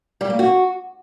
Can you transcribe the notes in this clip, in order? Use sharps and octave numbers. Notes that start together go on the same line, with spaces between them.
G3
A#3
F#4